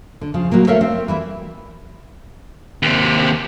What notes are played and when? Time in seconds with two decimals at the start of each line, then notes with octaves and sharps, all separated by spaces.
0.21 D3
0.34 C#3 F3
0.52 A#2 F#3 G3 A#3
0.67 A3 A4 A#4 C#5 E5 F5
0.81 C4
1.08 E3 G3 E4
2.83 D#2 C3